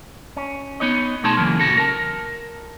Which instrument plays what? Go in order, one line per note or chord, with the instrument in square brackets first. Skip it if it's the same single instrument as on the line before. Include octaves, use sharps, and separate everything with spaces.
[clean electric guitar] C#4
B3 D#4 C#5 D#5
B2 A3 D#4 G#4 A5 C6
C#3 E3 F#3 A#3
A#2 C#3 E3 F#4 A4
A#4 A5